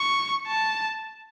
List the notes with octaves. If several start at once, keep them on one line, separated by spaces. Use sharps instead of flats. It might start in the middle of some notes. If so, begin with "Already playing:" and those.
Already playing: C#6
A5